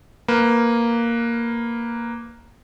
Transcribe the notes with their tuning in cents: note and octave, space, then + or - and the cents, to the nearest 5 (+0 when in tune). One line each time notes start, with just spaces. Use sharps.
A#3 +0 B4 +0